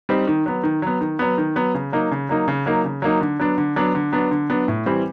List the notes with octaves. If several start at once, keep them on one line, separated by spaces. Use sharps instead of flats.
G3 C4 D#4
D#3
F#3 B3
D#3
F#3 B3
D#3
F#3 B3
D#3
F#3 B3
C#3
F#3 A#3 D#4
C#3
F#3 A#3 D#4
C#3
F#3 A#3 D#4
C#3
F#3 A#3 D#4
D3
F#3 B3 D4
D3
F#3 B3 D4
D3
F#3 B3 D4
D3
F#3 B3 D4
A2
E3 G3 C4